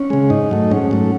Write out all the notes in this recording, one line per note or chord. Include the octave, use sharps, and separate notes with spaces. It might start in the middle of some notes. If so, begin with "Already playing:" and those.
Already playing: C#4
C#3 G#3
G#2 D#4
F#3 A3
G#2 C#4
F#3 A3